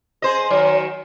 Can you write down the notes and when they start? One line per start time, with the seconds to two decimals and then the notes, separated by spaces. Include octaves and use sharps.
0.22 G#4 C5 D#5
0.50 D#3 F#3